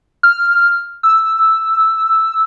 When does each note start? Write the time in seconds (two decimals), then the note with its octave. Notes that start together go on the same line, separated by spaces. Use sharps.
0.23 F6
1.03 E6